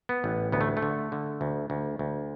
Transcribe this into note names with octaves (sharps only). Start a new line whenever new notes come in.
B3
A1
D2 B3
A3
A3
D3
D3
D2
D2
D2